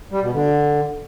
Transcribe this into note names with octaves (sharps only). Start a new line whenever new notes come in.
G3
B2
D3